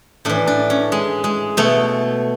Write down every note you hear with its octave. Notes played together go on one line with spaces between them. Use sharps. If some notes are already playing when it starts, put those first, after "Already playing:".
A2 E3 D4
D4
C#4
G#3
G#3
B2 A3